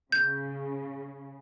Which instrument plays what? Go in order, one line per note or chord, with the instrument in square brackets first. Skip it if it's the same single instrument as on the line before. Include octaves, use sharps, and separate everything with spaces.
[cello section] C#3 [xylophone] G6